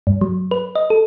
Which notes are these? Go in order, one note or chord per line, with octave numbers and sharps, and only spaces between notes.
G2
F#3
B4
D#5
A4